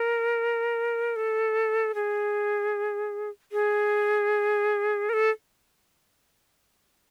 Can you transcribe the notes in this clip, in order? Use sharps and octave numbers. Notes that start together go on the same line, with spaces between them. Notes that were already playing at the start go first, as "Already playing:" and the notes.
Already playing: A#4
A4
G#4
G#4
A#4
A4